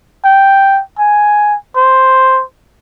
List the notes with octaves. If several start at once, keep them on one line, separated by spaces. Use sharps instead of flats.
G5
G#5
C5